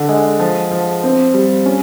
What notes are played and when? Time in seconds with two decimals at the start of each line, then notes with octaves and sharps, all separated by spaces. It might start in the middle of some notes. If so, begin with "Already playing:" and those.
Already playing: D3
0.09 G#3
0.39 F3
0.71 F3
1.03 C4
1.34 G3
1.66 C#4